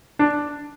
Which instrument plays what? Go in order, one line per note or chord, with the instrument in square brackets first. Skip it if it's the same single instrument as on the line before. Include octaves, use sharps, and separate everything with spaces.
[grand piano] D4